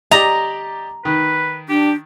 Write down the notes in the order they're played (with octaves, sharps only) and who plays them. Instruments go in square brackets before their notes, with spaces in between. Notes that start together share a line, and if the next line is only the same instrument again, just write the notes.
[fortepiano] G4 D5 D#5 [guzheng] A#5
[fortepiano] D#3 [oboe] B4
[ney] D4 [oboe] G4